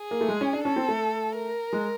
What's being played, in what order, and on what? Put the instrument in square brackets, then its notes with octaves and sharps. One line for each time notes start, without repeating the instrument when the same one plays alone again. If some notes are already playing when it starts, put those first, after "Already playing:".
Already playing: [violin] G#4
[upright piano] A#3
A3
G#3
C#4
D4
[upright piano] C#4 [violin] A4
[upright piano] C4
A3
[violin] A#4
[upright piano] G#3